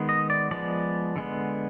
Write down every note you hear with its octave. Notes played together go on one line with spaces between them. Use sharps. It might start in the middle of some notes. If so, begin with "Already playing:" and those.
Already playing: D#3 G#3 B3
D#5
D5
F3 G#3 B3 D5
D3 G#3 B3